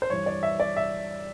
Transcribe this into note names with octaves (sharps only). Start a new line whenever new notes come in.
C5
G2 E3 C#5
D5
E5
D5
E5